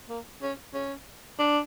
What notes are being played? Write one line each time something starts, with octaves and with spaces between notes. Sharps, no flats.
A#3
C#4
C#4
D4